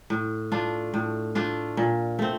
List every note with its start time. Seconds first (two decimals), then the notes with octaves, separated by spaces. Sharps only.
0.10 A2
0.52 A3 D4 F4
0.94 A2
1.35 A3 D4 F4
1.77 A#2
2.19 A3 C4